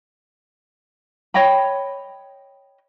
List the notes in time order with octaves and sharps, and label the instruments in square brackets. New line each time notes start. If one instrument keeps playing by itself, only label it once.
[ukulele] C#5 D#5 G5 B5